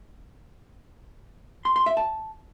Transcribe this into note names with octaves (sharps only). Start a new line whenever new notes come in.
C6
C6
E5
A5